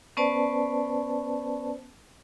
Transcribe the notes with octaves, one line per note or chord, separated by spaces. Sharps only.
B3 C#4 B4 C5 D5 A5